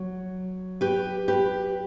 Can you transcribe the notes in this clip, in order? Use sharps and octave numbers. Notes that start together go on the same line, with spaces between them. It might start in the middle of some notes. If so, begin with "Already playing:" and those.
Already playing: F#3
G4 B4
G4 B4